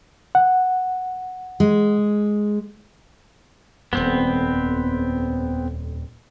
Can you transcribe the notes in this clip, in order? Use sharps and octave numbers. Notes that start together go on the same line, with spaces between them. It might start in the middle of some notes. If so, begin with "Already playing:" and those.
F#5
G#3
D#1 F2 B3 C4